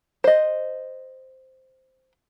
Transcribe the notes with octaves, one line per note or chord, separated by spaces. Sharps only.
C5 D#5